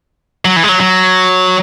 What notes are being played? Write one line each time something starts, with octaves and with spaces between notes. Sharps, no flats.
F#3
E3
G#3
F#3
F#3